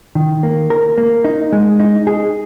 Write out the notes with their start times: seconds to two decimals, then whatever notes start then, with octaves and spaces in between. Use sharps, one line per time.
0.15 D#3
0.43 A#3
0.70 A#4
0.98 A#3
1.24 D#4
1.52 G#3
1.79 D#4
2.07 G#4